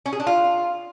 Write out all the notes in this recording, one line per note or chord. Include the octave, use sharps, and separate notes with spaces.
C#4
G#4
D4
F4